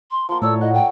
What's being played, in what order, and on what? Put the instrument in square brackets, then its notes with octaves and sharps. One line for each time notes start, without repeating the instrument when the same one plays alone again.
[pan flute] C6
[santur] F3 A#3 [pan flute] C6
[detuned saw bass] A2 [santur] A4 C#5 D5 [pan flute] E6
[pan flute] D#5 [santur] F#5
[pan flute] G5